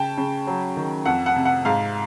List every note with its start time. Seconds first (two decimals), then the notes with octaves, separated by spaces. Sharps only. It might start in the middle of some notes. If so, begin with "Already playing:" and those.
Already playing: C#3 G5 A5
0.18 C#3
0.47 F#3
0.77 D#3
1.05 F2 F#5
1.26 F#5
1.36 C3
1.45 F#5
1.65 G#2 F5